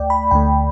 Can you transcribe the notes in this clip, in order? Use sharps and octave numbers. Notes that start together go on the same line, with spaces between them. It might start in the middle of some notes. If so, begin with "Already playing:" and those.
Already playing: D2 A3 D5 G5
B5
D2 D3 A3 G5